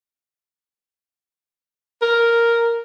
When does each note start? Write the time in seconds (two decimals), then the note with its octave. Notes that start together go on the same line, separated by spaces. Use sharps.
2.02 A#4